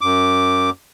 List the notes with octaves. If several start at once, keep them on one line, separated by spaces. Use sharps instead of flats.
F#2 D6